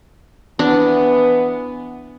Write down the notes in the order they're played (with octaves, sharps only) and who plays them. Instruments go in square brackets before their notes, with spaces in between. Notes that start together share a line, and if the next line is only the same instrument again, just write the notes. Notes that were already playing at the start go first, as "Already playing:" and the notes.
[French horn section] E3 B3 [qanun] D4